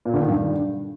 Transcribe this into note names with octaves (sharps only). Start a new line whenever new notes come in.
A#2
D3
D#3
G2